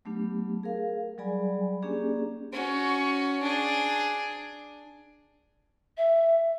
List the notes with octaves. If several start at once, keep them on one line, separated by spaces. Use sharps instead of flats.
F#3 A3 B3 D4 G4
G#4 A#4 F5
F#3 G3 G#4 D5 G#5 B5
A#3 C#4 D4 G4 G#4 D5
C#4 F#4
D4 G#4
E5